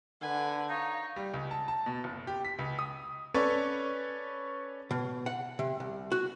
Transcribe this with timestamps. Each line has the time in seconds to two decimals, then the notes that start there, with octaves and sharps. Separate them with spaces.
0.22 D3 B4 F#5 G#5
0.69 D#4 C#5 F5
1.16 G3
1.34 C#2
1.51 A5
1.68 A5
1.86 B2
2.04 F#1
2.27 G4
2.45 B6
2.59 C#2
2.79 D#6
3.34 C#4 A4 B4 C#5 D5 C#6
4.91 B2
5.26 F#5
5.59 C3
5.80 C2
6.12 F#4